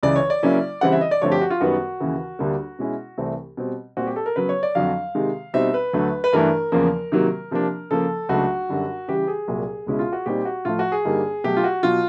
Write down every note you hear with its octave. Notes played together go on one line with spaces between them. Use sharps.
C#2 C#3 E3 D5
C#5
D5
C#3 F#3 A#3 C#4 E4
C#3 E3 G3 C4 E4 F#5
E5
D#5
D5
G2 D3 F3 A3 C4 C#5
G4
F#4
F4
F#2 D#3 G3 B3 F#4
D#2 C#3 E3
D2 D3 G3 A#3 D4
B2 G#3 C#4 E4
C2 C3 E3 A3 C4
B2 G3 C4
A#2 G3 C4 F#4
G4
A4
A#4
C#3 F#3 B3 B4
C#5
D5
F2 D3 F#3 F5
C3 D#3 G#3
B2 G3 C4 D#4 E5
B4
D2 D3 F#3 A3
B4
G2 E3 A3 D4 A#4
E2 C#3 F3 A#3
C3 D#3 F#3 A#3
C3 F3 A#3 D4
C#3 F3 A#3 A4
C#2 C#3 F#3 A3 D4 F#4
F#2 D3 G3
C#3 E3 G3 G4
G#4
C2 A#2 F#3
C#2 B2 G#3 C#4 E4
F4
F#4
A#2 G3 C4 D#4 G4
F#4
A2 F3 A3 F4
F#4
G#4
G2 D3 G3 A#3 D#4
B2 F#3 A3 G4
F4
F#4
B2 F#3 F4